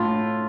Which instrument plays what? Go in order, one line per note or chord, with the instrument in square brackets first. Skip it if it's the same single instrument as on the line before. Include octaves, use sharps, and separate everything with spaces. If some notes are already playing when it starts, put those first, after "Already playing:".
Already playing: [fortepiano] A2 F4